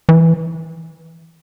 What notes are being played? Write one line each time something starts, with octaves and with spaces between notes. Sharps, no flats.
E3